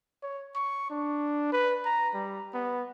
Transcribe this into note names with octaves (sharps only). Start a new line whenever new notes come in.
C#5
C#6
D4
B4
A#5
G3
B3